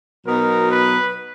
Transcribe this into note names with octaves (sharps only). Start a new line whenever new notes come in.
B2 F#3 B3 D#4 A#4
B4